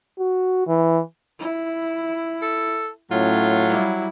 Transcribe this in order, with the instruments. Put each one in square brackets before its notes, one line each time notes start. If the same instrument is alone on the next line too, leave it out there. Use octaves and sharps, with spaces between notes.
[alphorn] F#4
E3
[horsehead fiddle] E4
[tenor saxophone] A4
[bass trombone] A2 [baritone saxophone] F#3 [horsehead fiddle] C#4 [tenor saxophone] F4
[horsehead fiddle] G3 E4